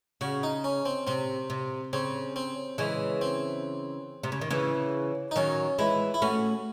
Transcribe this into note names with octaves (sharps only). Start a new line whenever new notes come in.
C#3 F#4
D#4
C#4
C4
C3 C4
C3
C#3 C4
C4
C#3 E3 G#3
C4
C3
C#3
D#3
C#3 E3
D#4
D#3 F#3 C#4
E3 G#3 E4
E4
A3 C#4 F#4